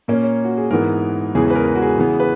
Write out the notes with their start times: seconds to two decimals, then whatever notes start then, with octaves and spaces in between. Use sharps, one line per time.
0.08 A#2 A#3 C#4
0.23 C#5
0.45 F#4
0.57 G#4
0.71 G#2 E3 B3 A#4
1.35 E2 C#3 E3 G#3 G#4
1.45 G#4
1.50 B4
1.55 A#4
1.66 A#4
1.75 F#4
1.82 G#4
1.97 C#3 E3 B3
2.20 B4